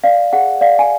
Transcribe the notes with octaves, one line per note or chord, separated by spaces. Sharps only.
D5 F5
G#4 F#5
D5 F5
G#5